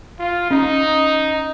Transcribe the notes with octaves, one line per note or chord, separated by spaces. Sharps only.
F4
C#4 D#4